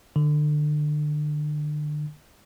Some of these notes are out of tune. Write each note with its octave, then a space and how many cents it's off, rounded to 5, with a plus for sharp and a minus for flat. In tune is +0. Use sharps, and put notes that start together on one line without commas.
D3 +30